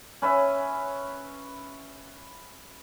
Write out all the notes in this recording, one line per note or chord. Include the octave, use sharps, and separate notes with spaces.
C#4 B4 E5